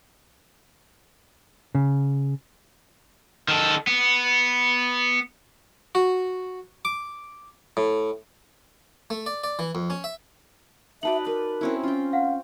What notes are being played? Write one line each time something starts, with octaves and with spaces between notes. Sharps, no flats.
C#3
D#3 A4
B3
F#4
D6
A2
A3
D5
D5
E3
F2
C#4
E5
D#4 F#4 B4 D5 E5 A5 F#7
A#4 B4
C4 C#4 E4
C#4 F4 G5
F5 F#5